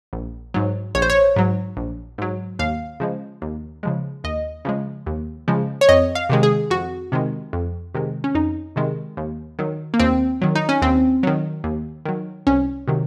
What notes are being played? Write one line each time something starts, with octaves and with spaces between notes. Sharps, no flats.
A#1
G#2 F#3
A#1 C#5
C5
C#5
G#2 F#3
A#1
G#2 F#3
D#2 F5
C#3 F3 G#3
D#2
C#3 F3 G#3
D#2 D#5
C#3 F3 G#3
D#2
C#3 F3 G#3
C#5
F2 D#5
F5
C3 D#3 G#3
G#4
F2 F#4
C3 D#3 G#3
F2
C3 D#3 G#3
C#4
F2 D#4
C3 D#3 G#3
D#2
D#3 F#3
A#3
D#2 C4
D#3 F#3
D#4
C#4
D#2 C4
D#3 F#3
D#2
D#3 F#3
C2 C#4
C3 D#3 F#3